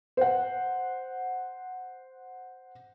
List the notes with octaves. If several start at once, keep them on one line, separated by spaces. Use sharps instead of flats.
C5 F#5